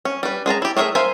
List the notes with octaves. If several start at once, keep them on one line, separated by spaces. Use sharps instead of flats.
C#4
G3 B4
G#3 G#4 A5 A#5
E4 G4
A3 G#4 A#4 C#5 E5
A#4 C5 E5 F5 G#5